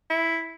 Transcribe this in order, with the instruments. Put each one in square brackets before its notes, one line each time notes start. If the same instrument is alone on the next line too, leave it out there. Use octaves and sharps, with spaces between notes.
[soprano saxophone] E4